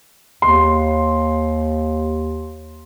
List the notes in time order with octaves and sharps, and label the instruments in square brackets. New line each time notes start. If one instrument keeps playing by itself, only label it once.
[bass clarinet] D#2 [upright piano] C6